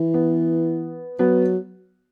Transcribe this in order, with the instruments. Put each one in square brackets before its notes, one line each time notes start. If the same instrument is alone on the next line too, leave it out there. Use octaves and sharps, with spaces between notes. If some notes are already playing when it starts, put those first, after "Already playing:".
Already playing: [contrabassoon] E3
[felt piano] B3
[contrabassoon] F#3 [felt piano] B3